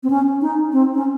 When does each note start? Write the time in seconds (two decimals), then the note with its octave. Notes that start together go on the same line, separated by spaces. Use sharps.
0.03 C4
0.10 C#4
0.42 D#4
0.72 C4
0.95 C#4